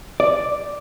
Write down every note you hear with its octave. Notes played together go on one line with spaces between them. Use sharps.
D5